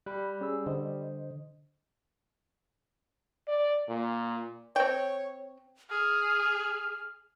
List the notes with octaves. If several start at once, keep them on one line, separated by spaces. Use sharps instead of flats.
G3 B5 F#6
C#4 G#4 E6
D3 C5 D#5
D5
A#2
C4 C#5 G5
G#4 F6